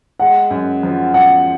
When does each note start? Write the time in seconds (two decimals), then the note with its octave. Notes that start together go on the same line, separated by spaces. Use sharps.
0.20 G#3 F#5
0.51 F#2
0.83 F3
1.14 F#2 F#5